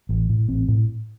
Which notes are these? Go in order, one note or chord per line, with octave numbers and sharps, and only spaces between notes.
A1
A2
A1 C4
A2